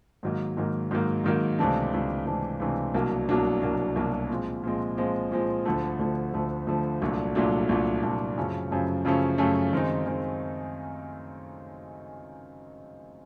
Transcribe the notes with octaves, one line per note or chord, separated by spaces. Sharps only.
G#2 D#3 F#3 A#3
G#2 D#3 F#3 A#3
G#2 D#3 F#3 A#3
G#2 D#3 F#3 A#3
C#2 C3 E3 A3 D4
C#2 C3 E3 A3 D4
C#2 C3 E3 A3 D4
C#2 C3 E3 A3 D4
C2 B2 F#3 A#3 D4
C2 B2 F#3 A#3 D4
C2 B2 F#3 A#3 D4
C2 B2 F#3 A#3 D4
A#2 F3 G#3 C4
A#2 F3 G#3 C4
A#2 F3 G#3 C4
A#2 F3 G#3 C4
D2 D3 F3 A3
D2 D3 F3 A3
D2 D3 F3 A3
D2 D3 F3 A3
C2 A#2 F#3 A3 D4
C2 A#2 F#3 A3 D4
C2 A#2 F#3 A3 D4
C2 A#2 F#3 A3 D4
F#2 C#3 F3 A3 C#4
F#2 C#3 F3 A3 C#4
F#2 C#3 F3 A3 C#4
F#2 C#3 F3 A3 C#4
F#2 D#3 G#3 C4 D#4
D#3 G#3 C4 D#4